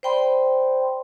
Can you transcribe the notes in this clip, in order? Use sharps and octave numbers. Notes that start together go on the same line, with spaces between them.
C5 D5 G5 B5 C6